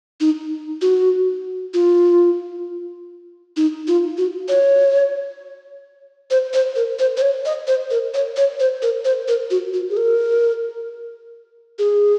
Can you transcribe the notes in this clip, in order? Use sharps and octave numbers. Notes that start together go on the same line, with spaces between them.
D#4
F#4
F4
D#4
F4
F#4
C#5
C5
C5
A#4
C5
C5
C#5
D#5
C5
A#4
C#5
C#5
C5
A#4
C5
A#4
F#4
F#4
G#4
A#4
G#4